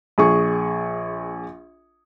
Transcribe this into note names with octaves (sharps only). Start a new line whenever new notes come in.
A#1 G#4 C#6